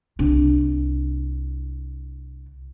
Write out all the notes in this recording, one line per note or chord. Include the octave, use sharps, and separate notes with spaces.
C2 D4